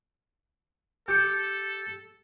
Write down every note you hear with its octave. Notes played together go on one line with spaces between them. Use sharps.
G4 A4 G6 C#7